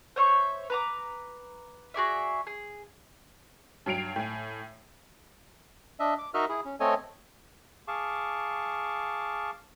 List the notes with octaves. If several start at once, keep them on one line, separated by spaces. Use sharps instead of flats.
C5 C#5 E5 C#6
B4 A#5 D6
F#4 G#4 D5 E5
G#4
G2 F#3 C7 D7 F7
A2 G#5
D4 D#5 E5
D6
D#4 F#4 A#4 D#5 E5 F6
E4 G#4
C#4
A3 C4 A4 C#5 D#5 G#5
G#4 F5 A5 C#6 D6